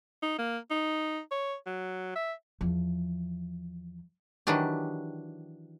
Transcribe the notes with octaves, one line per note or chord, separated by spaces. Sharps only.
D#4
A#3
D#4
C#5
F#3
E5
E2 F3
D#3 E3 F#3 D4 G4